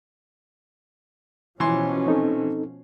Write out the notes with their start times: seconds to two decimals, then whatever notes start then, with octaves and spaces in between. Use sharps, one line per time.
1.60 B2 E3 F3 C#4 C6
2.07 C4 D#4 A4